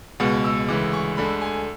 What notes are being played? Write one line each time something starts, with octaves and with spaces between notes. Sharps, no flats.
C#2 B2 G#3 F#5
E6
D2 C#3 E3 G#3 D6
C#6
D2 D3 G#3 B5
G#5